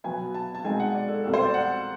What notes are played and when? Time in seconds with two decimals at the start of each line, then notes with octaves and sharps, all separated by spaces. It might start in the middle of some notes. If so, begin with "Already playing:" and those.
0.04 B2 F#3 B3 G#5
0.34 A5
0.55 A5
0.65 B2 G#3 C4 D#4 G#5
0.80 F#5
0.94 D5
1.08 A4
1.24 C2 B2 G3 C4 A4
1.34 C5
1.44 D5
1.54 F#5